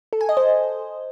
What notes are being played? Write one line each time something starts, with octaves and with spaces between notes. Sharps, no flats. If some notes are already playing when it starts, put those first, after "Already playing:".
A4
G#5
D#5
C5